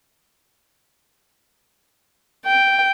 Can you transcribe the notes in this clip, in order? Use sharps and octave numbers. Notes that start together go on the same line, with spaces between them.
G5